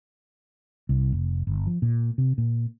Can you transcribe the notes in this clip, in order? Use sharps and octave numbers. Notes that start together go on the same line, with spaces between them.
C2
F1
G1
F3
A#2
C3
A#2